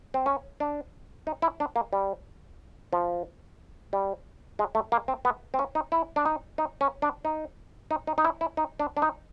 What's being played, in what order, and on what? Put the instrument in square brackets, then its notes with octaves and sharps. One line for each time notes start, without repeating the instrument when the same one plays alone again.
[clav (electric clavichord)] C4
C#4
D4
D#4
E4
D4
A#3
G3
F3
G3
G#3
A3
A#3
C4
B3
C4
C#4
D#4
E4
D4
D#4
D#4
C#4
D4
D#4
D#4
D#4
D#4
E4
E4
D#4
D4
D4
D#4